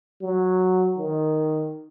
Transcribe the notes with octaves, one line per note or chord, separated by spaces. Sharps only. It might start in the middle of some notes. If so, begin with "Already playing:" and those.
F#3
D#3